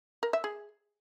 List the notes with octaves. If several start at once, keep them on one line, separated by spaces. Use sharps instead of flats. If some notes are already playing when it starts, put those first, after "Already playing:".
A#4
E5
G#4